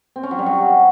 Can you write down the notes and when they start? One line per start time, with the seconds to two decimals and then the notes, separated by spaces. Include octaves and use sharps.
0.16 C4
0.23 C#4
0.31 F#3
0.39 G3
0.46 F#3